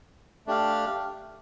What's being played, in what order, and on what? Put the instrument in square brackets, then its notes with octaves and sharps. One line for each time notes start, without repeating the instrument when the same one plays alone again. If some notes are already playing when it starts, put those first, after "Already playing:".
[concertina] A3 D4 G4 F5